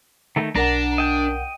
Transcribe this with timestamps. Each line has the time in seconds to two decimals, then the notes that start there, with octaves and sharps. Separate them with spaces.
0.36 D#3 A3 D#4
0.56 B1 D4 A#4 F#5 A#5
0.98 D#5 G5